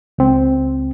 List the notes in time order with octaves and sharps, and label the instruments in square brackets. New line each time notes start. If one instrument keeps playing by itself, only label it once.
[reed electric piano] C#2 C4